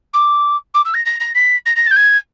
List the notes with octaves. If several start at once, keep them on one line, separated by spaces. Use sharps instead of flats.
D6
D6
E6
A#6
A#6
A#6
B6
A#6
A#6
A6
G6
G#6